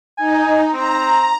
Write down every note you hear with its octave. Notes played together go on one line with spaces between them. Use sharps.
D#4 G#5
C4 A#5